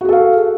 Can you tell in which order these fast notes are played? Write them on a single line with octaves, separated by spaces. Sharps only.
F#4 G#4 A4 F5